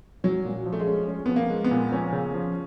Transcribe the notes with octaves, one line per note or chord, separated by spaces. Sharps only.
F#3 C#4
A#2
F3
A3
G#3
C#4
C#4
F3 B3
A#3
G#3
B3
A#2
F3 C#4
C#3
F3